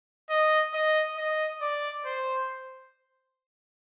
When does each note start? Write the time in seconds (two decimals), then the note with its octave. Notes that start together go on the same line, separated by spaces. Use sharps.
0.30 D#5
0.74 D#5
1.17 D#5
1.61 D5
2.05 C5